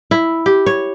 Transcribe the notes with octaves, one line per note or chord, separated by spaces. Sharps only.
E4
G4
C#5